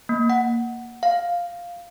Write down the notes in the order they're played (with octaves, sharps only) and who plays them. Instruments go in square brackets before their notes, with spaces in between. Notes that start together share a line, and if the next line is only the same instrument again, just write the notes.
[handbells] A#3
F#5
F5